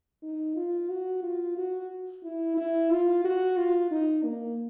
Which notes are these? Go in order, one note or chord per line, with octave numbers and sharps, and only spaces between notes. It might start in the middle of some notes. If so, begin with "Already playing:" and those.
D#4
F4
F#4
F4
F#4
E4
E4
F4
F#4
F4
D#4
A#3